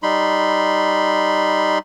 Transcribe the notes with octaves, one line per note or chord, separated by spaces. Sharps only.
G3 D#4 B5 C6